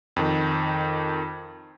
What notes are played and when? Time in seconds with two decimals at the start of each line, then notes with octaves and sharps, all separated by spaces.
0.16 F2 D#3